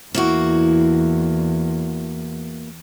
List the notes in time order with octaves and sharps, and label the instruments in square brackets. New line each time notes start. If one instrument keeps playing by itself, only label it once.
[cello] E2 [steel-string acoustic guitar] A#3 E4 F#4